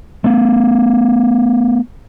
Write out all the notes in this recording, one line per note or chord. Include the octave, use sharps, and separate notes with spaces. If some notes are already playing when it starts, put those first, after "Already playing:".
A3 B3